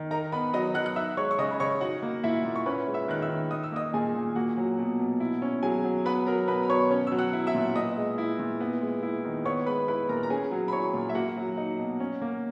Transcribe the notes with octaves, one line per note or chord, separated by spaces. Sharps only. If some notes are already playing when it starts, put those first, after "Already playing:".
Already playing: D#3
D#4 A#4 A#5
B3 B4 B5
F#3 D#5 D#6
F#3 F#5 F#6
F#6
D#4 E5 E6
G#3 C#5 C#6
C#6
C#3 D#5 D#6
B5
C#3 C#5 C#6
D#4 F#4 F#5
A#3
A#2 E4 E5
A#2
C#6
C#4 B4 B5
G#3
E5 E6
D#3 F#6
E5 E6
D#3
D#4 D#6
E6
A#3 D#5 D#6
A#2 G#4 G#5
A#2
A#3 F#4 F#5
F#3
B2
B2
E4
C#4
F#3 G#4 G#5
F#3
B3 B4 B5
F#3 A#4 A#5
B2 B4 B5
B5
B2 C#5 C#6
C#4
F#3 E6
F#5 F#6
E4
E5 E6
A#2
B3 D#5 D#6
G#3
E4
A#2
B3
G#3
E4
D#3
B3 C#5 C#6
G#3 B4 B5
E4 B4 B5
A#2 A#4 A#5
A#5
C#4 G#4 G#5
F#3
B5
E4 C#5 C#6
A#2
E5
A#3 F#4 F#5
F#3
D#4
B2
C#4
A#3